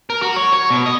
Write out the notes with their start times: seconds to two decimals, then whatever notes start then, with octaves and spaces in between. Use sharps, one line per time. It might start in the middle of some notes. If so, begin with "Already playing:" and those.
0.10 A#4
0.22 F#4
0.36 C#5
0.53 C#5
0.70 B2
0.86 D#5